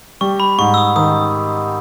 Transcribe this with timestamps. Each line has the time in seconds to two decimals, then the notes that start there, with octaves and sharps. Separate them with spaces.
0.21 G3 C#6
0.40 B5
0.58 G#2 C#6
0.74 E6
0.78 D#6
0.96 D#3 D#6